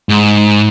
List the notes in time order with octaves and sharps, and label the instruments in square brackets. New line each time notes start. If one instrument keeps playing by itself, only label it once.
[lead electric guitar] G#2